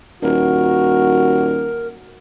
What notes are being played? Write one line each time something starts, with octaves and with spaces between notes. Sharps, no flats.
D#1 F#4 A#4